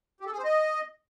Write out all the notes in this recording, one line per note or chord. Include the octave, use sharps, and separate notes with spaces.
G4
A4
G#4
C5
D#5